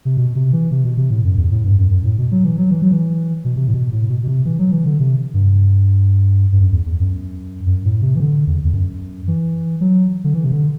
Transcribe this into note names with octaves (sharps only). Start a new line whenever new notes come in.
C3
B2
C3
E3
C3
B2
C3
A2
F#2
E2
A2
G2
F#2
F#2
A2
B2
F#3
E3
F#3
E3
F#3
E3
B2
C3
A2
B2
A2
B2
B2
C3
E3
F#3
E3
D3
C3
G2
G2
F#2
E2
E2
F#2
F#2
A2
C3
E3
D3
E2
E2
F#2
E3
F#3
D3
E3
C3
D3